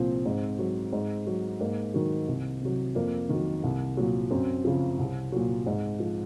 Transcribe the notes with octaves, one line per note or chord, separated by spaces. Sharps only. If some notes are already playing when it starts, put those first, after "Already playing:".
Already playing: C2 A#2 F3 C4
G#2
F#3
G#2
F#3
G#2 A#3
D#3 F#3
C2
C3 F#3
F2 A#3
D#3 F#3
C2
A#2 F#3
F#2 C4
C#3 F3
C2
A#2 F#3
G#2
F3